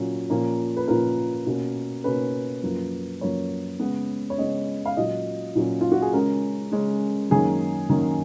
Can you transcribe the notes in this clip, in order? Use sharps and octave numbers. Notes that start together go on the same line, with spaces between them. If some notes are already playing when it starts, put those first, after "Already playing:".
Already playing: A#2 F#3 C#4
A#2 F3 A#3 C#4
B4
A#2 F3 A#3 C#4 A#4
B2 A#3 C#4
B2 A#3 C#4 B4
F#2 F3 A#3
F#2 F3 A#3 C#5
C#3 G#3 B3
C#5
C#3 G#3 B3 D#5
F5
A#2 F#3 C#4 D#5
A#2 F#3 C#4
F4
F#4
G#4
C#3 G#3 C#4 A#4
C#3 G#3 C#4
F#2 D#3 A#3 C#4 G#4
F#2 D#3 A#3 C#4